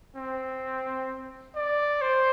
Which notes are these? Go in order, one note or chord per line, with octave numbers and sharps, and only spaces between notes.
C4
D5
C5